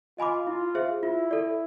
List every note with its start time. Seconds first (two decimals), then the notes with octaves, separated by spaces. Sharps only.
0.18 F4 D#5 G#5 B5 D6
0.47 E4 F4
0.75 G#4 C5 E5
1.03 E4 F4
1.31 A4 D5